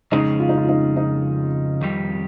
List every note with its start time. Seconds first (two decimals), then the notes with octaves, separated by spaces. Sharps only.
0.12 F2 C#3 G#3 C#4 D#4 G#4
0.40 F4
0.49 D#4
0.58 F4
0.69 D#4
0.97 D#4
1.81 F2 D#3 G3